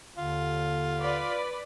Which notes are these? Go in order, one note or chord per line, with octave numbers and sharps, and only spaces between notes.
D#2 D3 F4
B4 D5 B5